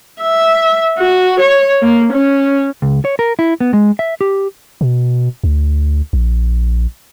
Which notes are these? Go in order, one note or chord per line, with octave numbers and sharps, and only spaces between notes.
E5
F#4
C#5
A#3
C#4
C#2
C#5
A#4
E4
B3
G#3
E5
G4
B2
D2
A#1